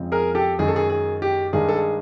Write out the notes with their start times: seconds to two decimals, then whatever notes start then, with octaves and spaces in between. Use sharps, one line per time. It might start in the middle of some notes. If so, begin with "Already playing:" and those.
Already playing: F2 C#3 F3 G#3 C4
0.12 G#4 A#4
0.35 G4 A4
0.59 F#2 D#3 G#3 G#4
0.68 A4
0.76 G#4
0.90 G#4
1.22 G4
1.53 G2 D#3 G#3 G#4
1.69 A4
1.76 G#4